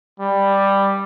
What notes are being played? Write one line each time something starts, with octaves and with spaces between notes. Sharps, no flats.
G3